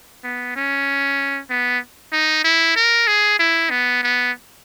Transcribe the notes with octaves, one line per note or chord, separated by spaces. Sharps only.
B3
C#4
B3
D#4
E4
A#4
G#4
E4
B3
B3